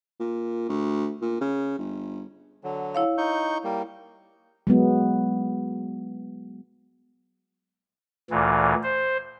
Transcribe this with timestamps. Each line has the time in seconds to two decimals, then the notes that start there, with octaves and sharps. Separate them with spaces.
0.20 A#2
0.69 D2
1.21 A#2
1.41 C#3
1.78 G1
2.64 D3 F#3
2.95 E4 C#5 F5
3.18 D#4 C#6 G6
3.64 G3 A#3
4.67 F#3 G#3 B3
8.30 D2 A#2 E3
8.83 C5